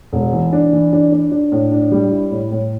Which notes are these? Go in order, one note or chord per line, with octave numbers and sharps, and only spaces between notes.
E1
E3
D4
E3
D4
D4
D4
A2
D4
G3
E4
A2
A2